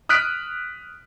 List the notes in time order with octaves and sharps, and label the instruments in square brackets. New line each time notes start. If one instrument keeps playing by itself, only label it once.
[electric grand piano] D#6 F6 F#6 B6 D7